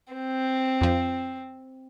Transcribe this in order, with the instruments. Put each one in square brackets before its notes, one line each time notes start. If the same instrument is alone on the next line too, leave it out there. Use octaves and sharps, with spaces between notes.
[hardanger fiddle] C4
[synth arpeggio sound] F2 F3